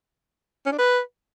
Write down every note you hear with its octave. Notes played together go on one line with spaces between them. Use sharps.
C#4
D4
B4